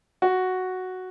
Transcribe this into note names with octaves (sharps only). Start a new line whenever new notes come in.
F#4